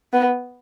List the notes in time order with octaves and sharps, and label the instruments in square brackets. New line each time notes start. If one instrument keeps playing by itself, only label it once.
[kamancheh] B3